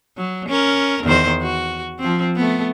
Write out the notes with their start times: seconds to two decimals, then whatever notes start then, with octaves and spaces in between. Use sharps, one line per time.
0.17 F#3
0.48 C#4 A#4
1.04 E2 D#3 C5
1.42 F#4
1.98 F3 C4
2.36 A3 B3